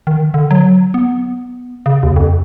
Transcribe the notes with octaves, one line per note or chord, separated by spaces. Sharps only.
D#3
D3
F#3
B3
C#3
D#2
F2